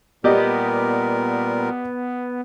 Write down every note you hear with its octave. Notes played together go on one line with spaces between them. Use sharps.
A#2 G3 B3 G4 A#4 D5 D#5